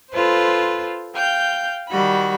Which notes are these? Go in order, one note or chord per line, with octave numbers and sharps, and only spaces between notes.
F4 A4 B4 C5
F5 G5 G6
D#3 G3 F#4 B5